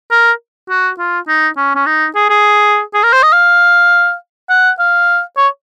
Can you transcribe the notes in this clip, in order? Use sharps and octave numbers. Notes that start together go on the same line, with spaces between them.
A#4
F#4
F4
D#4
C#4
C#4
D#4
G#4
G#4
G#4
A#4
C5
D#5
F5
F#5
F5
C#5